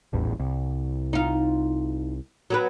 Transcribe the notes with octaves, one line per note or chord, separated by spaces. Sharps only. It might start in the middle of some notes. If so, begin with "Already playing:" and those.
D#1 A1 E2
C2
D#4 F4
F#3 B3 B4